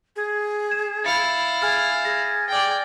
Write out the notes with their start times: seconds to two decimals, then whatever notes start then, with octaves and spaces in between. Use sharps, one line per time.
0.16 G#4
0.72 E7
1.05 E4 F5 A6 C#7
1.62 G#4 G#5 F6 A6
2.05 G#4 A#6
2.49 D5 G5